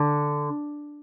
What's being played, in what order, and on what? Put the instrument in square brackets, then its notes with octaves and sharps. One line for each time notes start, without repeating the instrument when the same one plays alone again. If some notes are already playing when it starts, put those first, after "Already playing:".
Already playing: [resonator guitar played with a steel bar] D3